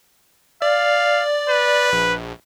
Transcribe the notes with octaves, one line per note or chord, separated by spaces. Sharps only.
D5 F5
B4
A#1